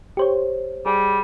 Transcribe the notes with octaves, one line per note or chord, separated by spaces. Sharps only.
G4 C5 C#5
G3 G#4